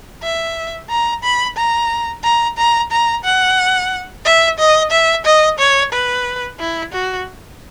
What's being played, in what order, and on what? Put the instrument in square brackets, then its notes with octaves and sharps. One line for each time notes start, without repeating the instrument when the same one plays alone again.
[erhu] E5
A#5
B5
A#5
A#5
A#5
A#5
F#5
E5
D#5
E5
D#5
C#5
B4
E4
F#4